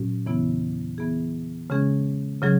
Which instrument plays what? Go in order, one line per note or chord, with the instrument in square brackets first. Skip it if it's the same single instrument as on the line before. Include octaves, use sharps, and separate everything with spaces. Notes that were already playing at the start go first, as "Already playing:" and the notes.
Already playing: [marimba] A#2 F#3 C#4 F#4
E2 C#3 E3 B3 E4
E3 B3 E4 G#4
C#3 G#3 C#4 G#4
C#3 F#3 C#4 G#4